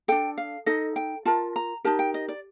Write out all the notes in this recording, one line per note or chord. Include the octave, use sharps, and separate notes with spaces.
D4 A4 G5
F5
D#4 A4 D#5
G5
F4 A#4 A5
A#5
D#4 G4 A#4 A5
G5
D#5
D5